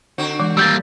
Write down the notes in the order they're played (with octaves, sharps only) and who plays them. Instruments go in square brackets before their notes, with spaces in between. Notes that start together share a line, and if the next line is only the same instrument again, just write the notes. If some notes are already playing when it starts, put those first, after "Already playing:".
[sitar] D3 C4 F#4
[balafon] E3 G#3
[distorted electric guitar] G3 A#3 [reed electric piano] E6 G6 A6